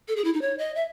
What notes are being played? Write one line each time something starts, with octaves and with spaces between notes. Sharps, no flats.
A4
G#4
E4
D#4
C#5
D#5
E5